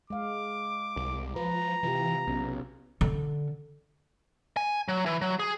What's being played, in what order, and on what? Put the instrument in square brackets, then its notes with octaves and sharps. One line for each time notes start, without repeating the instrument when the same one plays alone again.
[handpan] G#3 F5 [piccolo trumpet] D6
[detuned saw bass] C2
[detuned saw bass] F3 [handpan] B4 [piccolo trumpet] A#5
[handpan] C3 F4 G4 [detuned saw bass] E3
[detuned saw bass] B1 [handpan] B3 C#4
[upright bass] D3
[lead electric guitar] G#5
F#3
E3
F#3
G#4